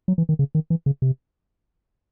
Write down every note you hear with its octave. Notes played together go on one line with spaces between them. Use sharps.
F#3
E3
D#3
C#3
D#3
E3
C#3
C3